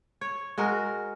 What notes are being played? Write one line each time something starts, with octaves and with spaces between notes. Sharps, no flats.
C#5
G#3 F#4 A#4